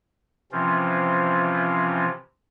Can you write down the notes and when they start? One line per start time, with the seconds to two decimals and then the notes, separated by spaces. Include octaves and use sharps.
0.52 C3 E3 F3 C4 C#4 F4